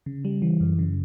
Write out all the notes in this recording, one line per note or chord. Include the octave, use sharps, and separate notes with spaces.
C#3
G3
E3
F#2
C#3